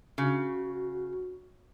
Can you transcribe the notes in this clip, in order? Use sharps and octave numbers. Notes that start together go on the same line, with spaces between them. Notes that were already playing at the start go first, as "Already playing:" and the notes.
C#3 F#4